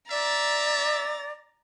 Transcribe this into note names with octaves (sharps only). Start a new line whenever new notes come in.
D5 E5 A#5 A6